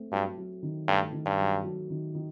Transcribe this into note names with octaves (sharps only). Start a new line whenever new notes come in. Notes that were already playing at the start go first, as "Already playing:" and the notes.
Already playing: A3 C4
G2 F#3
F#3
D#3
G2 A3
D#3
G2
F#3
F#3
D#3
D#3